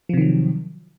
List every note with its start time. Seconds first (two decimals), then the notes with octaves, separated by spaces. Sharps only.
0.09 F3
0.13 C3
0.17 D#3
0.21 F#3